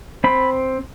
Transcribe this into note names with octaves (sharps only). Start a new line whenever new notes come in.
C4 B5